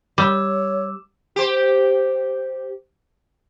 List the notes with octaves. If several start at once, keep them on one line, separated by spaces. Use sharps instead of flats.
G3 C#5 D6 E6 E7
G4 C5